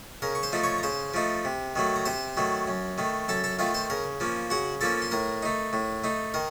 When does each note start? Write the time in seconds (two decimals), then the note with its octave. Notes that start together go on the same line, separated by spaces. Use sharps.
0.22 C#3 A#4 A#5
0.35 C#6
0.43 C5 C6
0.53 F3 A3 D#4
0.63 C#5 C#6
0.78 A#5
0.83 C#3 C5 C6
1.14 F3 A3 D#4
1.45 C3
1.76 D#3 F#3 A3
1.96 A#5
2.05 C3 C5 C6
2.37 D#3 F#3 A3
2.68 F#2
2.98 D#3 A3
3.28 F#2 A4 A5
3.44 A4 A5
3.59 D#3 A3 F4 F5
3.74 C5 C6
3.90 C#3 A#4 A#5
4.20 F3 A#3 C#4
4.50 C#3 F#4 F#5
4.81 F3 A#3 C#4 A4 A5
5.02 C6
5.11 A2 A#4 A#5
5.43 A3 D#4
5.73 A2
6.04 A3 D#4
6.34 D#3 A#4 A#5